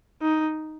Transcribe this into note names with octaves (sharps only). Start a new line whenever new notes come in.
D#4